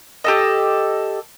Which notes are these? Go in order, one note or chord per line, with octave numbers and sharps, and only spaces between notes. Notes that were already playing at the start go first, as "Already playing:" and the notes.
G4 A4 D#5